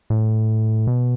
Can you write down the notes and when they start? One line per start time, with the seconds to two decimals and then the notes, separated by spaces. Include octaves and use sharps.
0.10 A2
0.87 B2